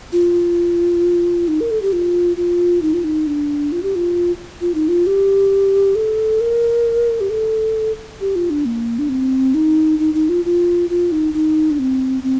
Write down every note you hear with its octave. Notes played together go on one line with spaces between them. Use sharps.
F4
D#4
A#4
A4
G4
F4
F4
D#4
F4
D#4
D4
F4
G4
F4
F4
D#4
F4
G4
A4
A#4
G4
A4
G4
F4
D4
A#3
D4
C4
D#4
D#4
D#4
F4
F4
F4
D#4
D#4
D4
C4
C4